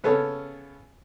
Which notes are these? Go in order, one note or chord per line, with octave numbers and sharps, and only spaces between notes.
C#3 B3 C#4 A4 C#5